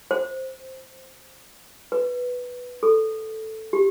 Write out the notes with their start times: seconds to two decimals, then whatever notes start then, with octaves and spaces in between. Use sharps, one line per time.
0.11 C5
1.92 B4
2.83 A4
3.73 G4